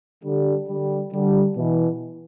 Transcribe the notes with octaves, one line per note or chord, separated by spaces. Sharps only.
D3 G3
D3 G3
D3 G3
B2 E3